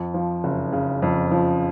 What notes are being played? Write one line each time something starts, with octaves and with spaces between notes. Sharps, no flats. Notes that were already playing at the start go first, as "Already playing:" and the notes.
Already playing: F2
F3
F#1
C#3
F2
F3